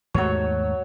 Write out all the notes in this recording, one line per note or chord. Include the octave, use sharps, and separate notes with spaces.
D#2 G#2 F#3 A3 C#5